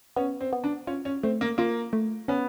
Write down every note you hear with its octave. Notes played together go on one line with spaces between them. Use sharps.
B3 C#4
C4
B3
D4
C#4 F4
C#4
A3 C4
A#3
A#3 F4
A3
B3 C#4